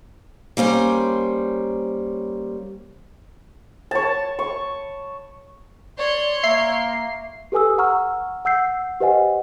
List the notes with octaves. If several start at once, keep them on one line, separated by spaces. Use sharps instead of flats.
G3 A#3 C#4 C5
C#5 A5
C#6
C#5 D5 C6
A#3 E5 C7
G4 A4 B4 G#5 D#6 E6
F#5 A#5 C#6 E6 F6
F#5 E6 G6 C7
G4 B4 C5 D#5 F#5 G#5